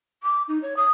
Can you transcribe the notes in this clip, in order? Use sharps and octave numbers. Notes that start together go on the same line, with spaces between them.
D6
D#4
C#5
D#6